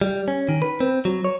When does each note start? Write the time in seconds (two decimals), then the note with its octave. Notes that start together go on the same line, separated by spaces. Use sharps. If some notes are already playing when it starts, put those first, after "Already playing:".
0.01 G3
0.28 C#4
0.49 D#3
0.62 B4
0.80 C4
1.05 F#3
1.25 C#5